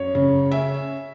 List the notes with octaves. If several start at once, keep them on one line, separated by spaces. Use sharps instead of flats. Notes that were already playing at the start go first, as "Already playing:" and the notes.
Already playing: F#2 C#5
C#3
C#4 E5